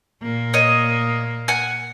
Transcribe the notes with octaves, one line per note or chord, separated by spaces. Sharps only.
A#2 A#3
C#5 D#5
F#5 G#5